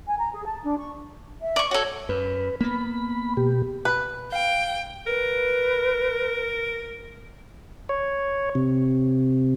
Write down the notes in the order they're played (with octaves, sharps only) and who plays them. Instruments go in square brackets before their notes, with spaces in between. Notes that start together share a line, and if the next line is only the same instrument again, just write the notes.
[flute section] G#5
A#5
G#4
A5
D4
C#6
[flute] E5
[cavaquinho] D5 C#6
[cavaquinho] F#4 A4 [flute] C#5
[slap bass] F#2 [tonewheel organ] B4
[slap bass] A#3 B3 [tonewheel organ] B5
[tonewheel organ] B2 G4
[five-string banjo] B4
[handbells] F5 [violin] G5
[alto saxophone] A#4 [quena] B4
[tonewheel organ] C#5
C3